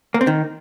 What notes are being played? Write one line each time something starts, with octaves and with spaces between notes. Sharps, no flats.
A#3
C4
D#3